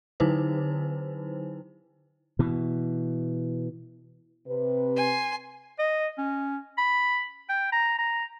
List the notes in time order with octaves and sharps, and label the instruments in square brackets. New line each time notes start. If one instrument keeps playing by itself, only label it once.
[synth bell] D3 F#3 D#4 E4 B4 C5
[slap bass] B2 E3
[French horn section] C3 B4
[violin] G#5 C6
[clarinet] D#5
C#4
B5
G5
A#5
A#5